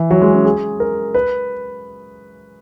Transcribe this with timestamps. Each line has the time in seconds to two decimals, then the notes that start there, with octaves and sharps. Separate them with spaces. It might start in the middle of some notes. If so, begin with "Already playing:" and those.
Already playing: E3
0.11 F#3
0.22 G#3
0.34 C#4
0.45 G#4
0.80 A#4
1.14 B4